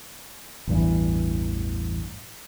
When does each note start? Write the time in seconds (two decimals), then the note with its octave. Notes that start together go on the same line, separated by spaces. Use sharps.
0.67 A1 E2 G2 E3